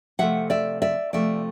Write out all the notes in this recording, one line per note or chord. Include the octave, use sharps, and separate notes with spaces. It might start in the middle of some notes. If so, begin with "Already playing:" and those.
C3 F3 A3 E5 F#5
D5 E5
D5 E5
C3 F3 A3 D5 E5